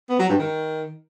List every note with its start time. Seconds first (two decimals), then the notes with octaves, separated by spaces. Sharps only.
0.09 B3
0.19 F#3
0.29 G2
0.39 D#3